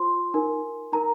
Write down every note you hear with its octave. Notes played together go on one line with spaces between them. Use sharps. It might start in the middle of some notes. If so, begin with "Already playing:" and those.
Already playing: F4 C5 C6
D#4 A#4
D#4 A#4 A#5